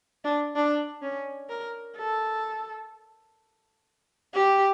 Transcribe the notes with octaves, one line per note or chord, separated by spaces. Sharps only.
D4
D4
C#4
A#4
A4
G4